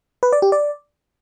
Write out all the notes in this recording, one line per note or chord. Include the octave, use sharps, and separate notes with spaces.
B4
D5
G4
D5